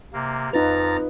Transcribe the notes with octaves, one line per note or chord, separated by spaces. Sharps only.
C3 A#3
F2 D#4 F4 B4 A#5 A6